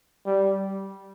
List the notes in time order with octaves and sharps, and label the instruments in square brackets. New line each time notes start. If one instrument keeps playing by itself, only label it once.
[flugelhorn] G3